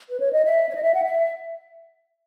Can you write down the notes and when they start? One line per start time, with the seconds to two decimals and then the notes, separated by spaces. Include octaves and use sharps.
0.08 B4
0.20 C#5
0.32 D#5
0.44 E5
0.69 C#5
0.74 D#5
0.84 E5
0.93 F#5
1.02 E5